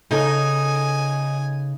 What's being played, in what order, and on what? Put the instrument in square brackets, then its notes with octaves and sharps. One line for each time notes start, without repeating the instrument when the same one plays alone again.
[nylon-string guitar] C#3 A4 [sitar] D#4 [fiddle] G#5